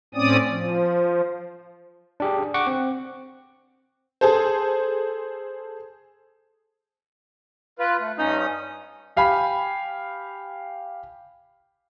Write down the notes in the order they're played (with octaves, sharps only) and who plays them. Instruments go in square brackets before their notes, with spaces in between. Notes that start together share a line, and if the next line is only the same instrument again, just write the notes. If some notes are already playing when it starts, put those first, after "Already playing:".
[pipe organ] A2 C4 C#4 D5 D#6
F3
[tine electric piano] D4 G4 G#4
F#5 C#6 D6
C4
[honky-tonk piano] G#4 A4 C5
[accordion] F4 B4
A3
[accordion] G2 C#4 D#6 [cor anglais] D#4
[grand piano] G4 F5 G#5 B5